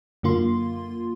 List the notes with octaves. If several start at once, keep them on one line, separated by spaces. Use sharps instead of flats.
F#2 D3 A#3 F4 C6